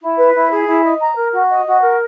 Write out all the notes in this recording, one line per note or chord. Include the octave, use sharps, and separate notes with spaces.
E4
B4
E4
G#4
E4
D#5
A#5
A#4
F#4
D#5
F#4
A#4